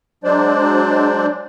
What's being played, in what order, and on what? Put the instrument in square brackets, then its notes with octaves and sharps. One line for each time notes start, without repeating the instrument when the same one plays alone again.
[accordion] F#3 G#3 D4 C5 D5